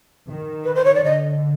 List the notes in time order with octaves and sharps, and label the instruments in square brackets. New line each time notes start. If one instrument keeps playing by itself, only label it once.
[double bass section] D#3
[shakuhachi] B4
C5
C#5
D5
[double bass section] D3 [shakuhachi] D#5